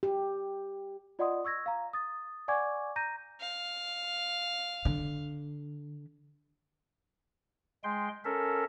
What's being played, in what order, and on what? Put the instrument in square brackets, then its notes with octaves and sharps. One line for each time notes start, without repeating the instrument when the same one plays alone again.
[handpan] G4
[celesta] F4 D5 D#5 F#5 C6 D#6
C#6 E6 G#6 A#6
F5 A#5
D#6 A6
D5 F#5 G#5 C#6 D6 G#6
A#5 G6 A#6 D#7
[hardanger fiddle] F5
[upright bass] D3
[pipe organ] G#3 G5 C6
C#4 A4 A#4 E5